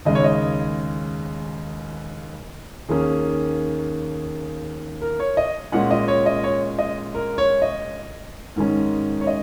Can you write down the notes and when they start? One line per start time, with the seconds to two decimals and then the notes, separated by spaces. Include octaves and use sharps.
0.05 D#2 C#3 G#3 D#5
0.15 C#5
0.24 D#5
2.89 D#2 D#3 A#3 C#4 G#4
5.02 A#4
5.20 C#5
5.37 D#5
5.72 A#2 G#3 C#4 F#5
5.91 D#5
6.08 C#5
6.26 D#5
6.44 C#5
6.79 D#5
7.15 A#4
7.38 C#5
7.62 D#5
8.56 G#2 D#3 G#3 C#4
9.21 C#5
9.27 D#5